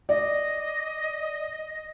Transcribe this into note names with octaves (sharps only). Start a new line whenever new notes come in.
D5 D#5